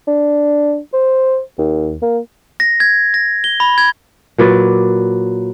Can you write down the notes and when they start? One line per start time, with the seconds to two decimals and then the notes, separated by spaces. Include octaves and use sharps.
0.08 D4
0.94 C5
1.58 D#2
2.02 A#3
2.60 A#6
2.80 G#6
3.14 A#6
3.44 G7
3.60 B5
3.78 G#6
4.38 A#2 F#3 B4 D5